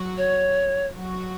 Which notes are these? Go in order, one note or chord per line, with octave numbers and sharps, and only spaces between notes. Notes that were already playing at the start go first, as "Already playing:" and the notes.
Already playing: F#3 F#4
C#5
F#3 F#4